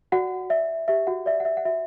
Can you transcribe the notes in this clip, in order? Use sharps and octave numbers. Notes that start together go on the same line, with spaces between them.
F#4 D5 F#5
D5 E5
G4 E5
F#4 F#5
D5 E5
F#5
E5
F#5
F#4 E5